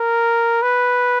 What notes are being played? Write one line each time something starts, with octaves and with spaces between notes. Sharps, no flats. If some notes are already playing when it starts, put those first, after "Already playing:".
Already playing: A#4
B4